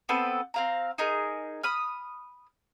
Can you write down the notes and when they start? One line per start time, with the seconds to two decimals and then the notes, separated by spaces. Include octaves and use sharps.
0.09 B3 C4 A4 B4
0.54 C4 F5 A#5
0.98 D#4 G#4 A#4
1.63 B5 D#6 F6